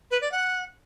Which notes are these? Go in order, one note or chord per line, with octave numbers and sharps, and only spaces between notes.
B4
D5
F#5